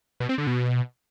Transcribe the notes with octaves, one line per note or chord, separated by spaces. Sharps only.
B2
C4
D3
B2